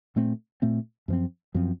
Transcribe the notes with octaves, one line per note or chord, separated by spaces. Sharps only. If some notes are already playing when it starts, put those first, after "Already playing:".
A#2 A3 C4
A#2 A3 C4
F#2 F3 C4
F#2 F3 C4